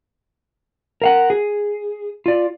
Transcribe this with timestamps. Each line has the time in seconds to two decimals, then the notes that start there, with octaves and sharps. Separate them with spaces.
1.02 A#4 F5 F#5
1.30 G#4
2.26 F4 D5